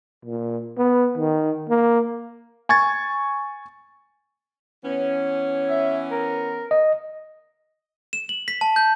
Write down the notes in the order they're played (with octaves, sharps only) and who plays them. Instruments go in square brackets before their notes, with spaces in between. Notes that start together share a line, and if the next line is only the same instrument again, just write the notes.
[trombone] A#2
B3
D#3
A#3
[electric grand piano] G#5 C#6 G#6 A6
[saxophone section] E3 B3 C#4
[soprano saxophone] E5
A#4
[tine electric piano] D#5
[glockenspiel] E7
F#7
B6
A5
G6